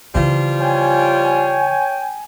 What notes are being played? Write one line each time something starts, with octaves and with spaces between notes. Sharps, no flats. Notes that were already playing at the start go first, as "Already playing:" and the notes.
C#3 E3 F3 G3 F4
C#5 G5 G#5